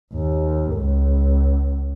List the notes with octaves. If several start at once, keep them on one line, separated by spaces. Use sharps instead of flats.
D#2
C#2